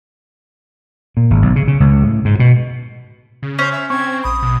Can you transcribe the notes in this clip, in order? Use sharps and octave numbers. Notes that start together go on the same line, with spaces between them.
A#2
G#1
B1
C#3
C#3
C#2
A2
G#2
B2
C#3
C#4 C5
E5
C4 C#6 G#6
A#1 B5 D#6
B2